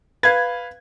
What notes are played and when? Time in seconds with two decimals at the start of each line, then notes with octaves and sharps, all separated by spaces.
0.23 B4 F5 G#6